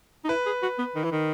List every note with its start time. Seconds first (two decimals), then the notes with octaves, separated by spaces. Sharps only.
0.24 D#4
0.29 E4 B4
0.46 G#4
0.63 F#4
0.78 B3
0.95 D#3
1.04 E3
1.12 D#3